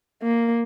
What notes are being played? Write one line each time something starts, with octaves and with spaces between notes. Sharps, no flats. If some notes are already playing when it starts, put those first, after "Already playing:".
A#3